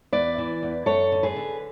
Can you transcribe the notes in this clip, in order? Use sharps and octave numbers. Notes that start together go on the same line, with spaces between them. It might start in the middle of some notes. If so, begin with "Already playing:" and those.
E2 B4 D5
E3
E2
F#2 A4 C#5
D3
G#4 B4
D3